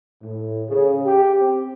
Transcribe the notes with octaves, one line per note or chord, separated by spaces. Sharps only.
A2
C#3
G4
C4